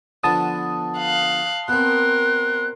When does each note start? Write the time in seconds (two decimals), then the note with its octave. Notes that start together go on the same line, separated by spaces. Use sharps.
0.24 D3 F3 B3 A5 D#6
0.98 F5 F#6
1.68 B2 C4 A#4 C6 F#6